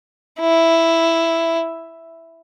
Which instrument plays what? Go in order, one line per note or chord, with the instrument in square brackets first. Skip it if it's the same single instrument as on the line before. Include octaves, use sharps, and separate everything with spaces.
[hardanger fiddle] E4